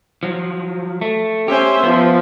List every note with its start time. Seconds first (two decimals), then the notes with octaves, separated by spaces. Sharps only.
0.23 F3 F#3
1.01 A3
1.48 C#4 G4 C5 E5
1.83 F3 B3